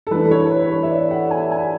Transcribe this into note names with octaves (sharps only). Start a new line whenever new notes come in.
A4
E3 A3 D4 B4
C#5
B4
C#5
E5
D5
F#5
G#5
G#5